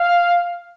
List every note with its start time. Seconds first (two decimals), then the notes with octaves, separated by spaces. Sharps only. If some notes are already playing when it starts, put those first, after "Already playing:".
Already playing: F5